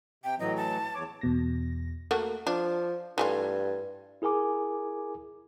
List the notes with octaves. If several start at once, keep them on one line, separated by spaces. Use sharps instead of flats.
C3 G5
A2 E3 F#3 D#5
A5
E2 C#5 D6
E2 B2 A#6
A3 A#3 F#4
F3 D4
G2 E3 A3 F4
E4 G#4 A#4 G#5 D6